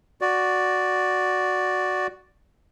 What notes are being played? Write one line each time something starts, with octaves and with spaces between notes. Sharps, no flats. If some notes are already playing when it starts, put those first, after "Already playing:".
F#4 D5